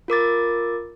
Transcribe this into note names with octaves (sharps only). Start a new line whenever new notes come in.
F4 A#4 D6 A6